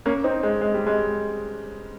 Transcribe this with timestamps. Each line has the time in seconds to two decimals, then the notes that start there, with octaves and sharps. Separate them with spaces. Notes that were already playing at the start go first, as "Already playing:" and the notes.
0.06 A#3 C#4
0.24 C4 D#4
0.43 G#3
0.61 G#3
0.74 G3
0.87 G#3